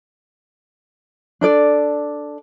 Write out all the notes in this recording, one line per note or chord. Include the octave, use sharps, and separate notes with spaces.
D4 A4 D5